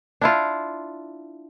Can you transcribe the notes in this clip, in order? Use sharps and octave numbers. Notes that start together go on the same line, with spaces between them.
D4 E4 F4